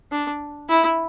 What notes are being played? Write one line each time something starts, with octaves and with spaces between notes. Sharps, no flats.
D4
E4